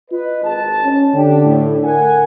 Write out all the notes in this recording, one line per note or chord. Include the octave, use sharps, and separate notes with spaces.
F4 B4 D#5
G#1 G#2 A5
C#4
D3 D4 G4
A2
A#4 F#5 G#5